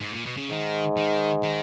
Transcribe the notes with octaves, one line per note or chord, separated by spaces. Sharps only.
G#2
A#2
B2
C#3
G#2 D#3
D#3
D#3